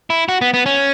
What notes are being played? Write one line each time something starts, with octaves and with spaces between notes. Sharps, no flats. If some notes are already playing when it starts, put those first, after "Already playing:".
E4
F#4
B3
B3
C#4